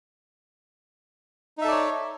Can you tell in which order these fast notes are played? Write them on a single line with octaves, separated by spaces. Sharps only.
D#4 E5 A4 D5 C#5